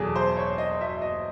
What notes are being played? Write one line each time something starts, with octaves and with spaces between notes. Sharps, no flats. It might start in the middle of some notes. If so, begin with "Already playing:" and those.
Already playing: E2 B2 F#3 G#4 A4
C5
C#5
D#5
E5
D#5